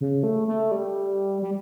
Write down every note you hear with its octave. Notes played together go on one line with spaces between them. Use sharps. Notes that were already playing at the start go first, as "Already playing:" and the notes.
C#3
A3
A3
G3
G3